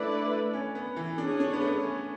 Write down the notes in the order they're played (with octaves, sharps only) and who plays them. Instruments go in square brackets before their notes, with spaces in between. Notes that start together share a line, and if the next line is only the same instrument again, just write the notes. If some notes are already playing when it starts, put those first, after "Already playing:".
Already playing: [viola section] A3 E4 B4 D5 [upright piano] D4
[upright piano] C#4
B3
E3
[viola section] C#4 G#4 C#5 [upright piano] D4
[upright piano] D4
B3
A3
C#4